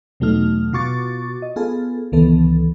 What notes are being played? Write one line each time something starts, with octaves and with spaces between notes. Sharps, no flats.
E2 B2 F#3 A3 D#4 F6
B2 F4 F#4 C#6 D6 A6
D#5
B3 F4 G#4 A4
C#2 D#3 E3 B3 A4